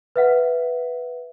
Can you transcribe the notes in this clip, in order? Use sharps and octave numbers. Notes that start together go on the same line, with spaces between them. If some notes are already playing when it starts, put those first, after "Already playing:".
B4 E5 F#5